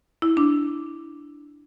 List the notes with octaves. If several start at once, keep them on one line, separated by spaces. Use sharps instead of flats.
E4
D4